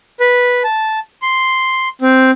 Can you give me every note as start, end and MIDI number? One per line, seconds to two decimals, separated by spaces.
0.20 0.63 71
0.64 0.99 81
1.22 1.88 84
2.02 2.31 60